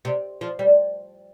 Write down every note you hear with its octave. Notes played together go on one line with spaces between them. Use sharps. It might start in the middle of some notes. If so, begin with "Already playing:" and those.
C3
F3
G3